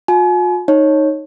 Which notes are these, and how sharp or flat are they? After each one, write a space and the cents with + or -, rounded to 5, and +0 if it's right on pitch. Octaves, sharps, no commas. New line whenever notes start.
F4 +45 G#5 +40
D#4 +0 C#5 -15